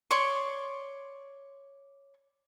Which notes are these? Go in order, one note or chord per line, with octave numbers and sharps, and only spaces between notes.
C#5 D5 C6 C#6